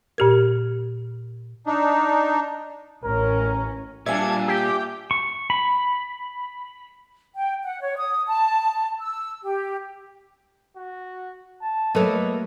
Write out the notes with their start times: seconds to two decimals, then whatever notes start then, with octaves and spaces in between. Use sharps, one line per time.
0.18 A#2 G4 A#4
1.66 D4 D#4
3.05 A1 C#4 A#4
4.06 A#2 G3 D4 E5 F5 G#5 A5 G#6
4.48 G4 G5
5.11 C#6
5.50 B5
7.35 G5
7.63 F#5
7.81 C#5
7.97 D#6
8.27 A5
8.99 E6
9.43 G4
10.76 F#4
11.61 A5
11.95 F#3 A3 A#3 A4 B4 C#5 D#5 E5